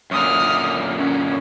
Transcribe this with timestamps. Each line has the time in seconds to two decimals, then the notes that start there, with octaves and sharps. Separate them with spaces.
0.11 F#2 A#2 D3 D#6 F6
0.98 C#4